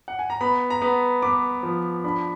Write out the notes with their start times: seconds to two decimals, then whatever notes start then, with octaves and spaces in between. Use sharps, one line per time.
0.08 F#5
0.19 G#5
0.30 A#5
0.41 B3 B5
0.70 A#5
0.81 B3 B5
1.22 B3 D6
1.63 F3
2.04 D4 B5